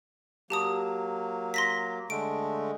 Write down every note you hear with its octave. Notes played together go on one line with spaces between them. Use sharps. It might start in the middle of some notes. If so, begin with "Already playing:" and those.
F#3 A#3 G4 A5 D#6
C6 A#6 B6
D3 G#3 A3 D7